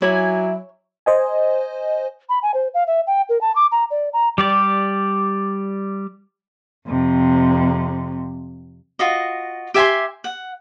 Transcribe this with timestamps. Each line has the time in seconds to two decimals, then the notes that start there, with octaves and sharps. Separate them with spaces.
0.02 F#3 E4 C#5 D5 G#5
1.06 C5 D#5 G#5
2.29 B5
2.42 G#5
2.54 C5
2.74 F5
2.87 E5
3.07 G5
3.29 A#4
3.41 A5
3.55 D6
3.71 A#5
3.91 D5
4.13 A#5
4.38 G3 G4 D5
6.87 F2 C3
8.99 F4 F#4 D#5
9.74 G4 E5 G#5 C6
10.24 F#5